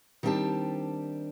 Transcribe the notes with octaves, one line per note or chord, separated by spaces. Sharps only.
D#3 G3 C4 D4 G4 A5